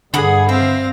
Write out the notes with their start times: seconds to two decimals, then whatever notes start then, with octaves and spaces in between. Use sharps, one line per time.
0.14 G2 D3 G#4 F#5 B5 D#6
0.49 C4 E5 F5 A#6